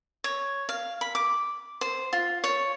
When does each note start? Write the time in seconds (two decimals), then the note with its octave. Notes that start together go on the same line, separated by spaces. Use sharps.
0.24 C#5
0.69 F5
1.01 B5
1.15 D6
1.81 C5
2.13 F4
2.44 C#5